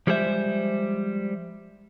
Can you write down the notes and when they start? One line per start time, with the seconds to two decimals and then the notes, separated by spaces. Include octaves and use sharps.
0.07 F3 G3 G#3 G#4 C5 E5